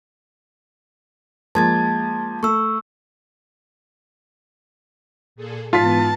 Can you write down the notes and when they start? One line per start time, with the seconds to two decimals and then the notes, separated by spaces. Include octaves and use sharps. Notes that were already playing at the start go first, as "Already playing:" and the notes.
1.55 F3 G#3 A#3 A5 G#6 A6
2.43 A3 C#6 E6
5.36 A#2 G#4 A4
5.73 G#2 E3 B3 F4 A5 B6